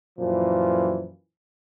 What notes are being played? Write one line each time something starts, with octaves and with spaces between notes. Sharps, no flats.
F#2 A#2 E3 F3